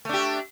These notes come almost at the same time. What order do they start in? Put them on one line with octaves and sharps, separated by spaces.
A3 D4 G4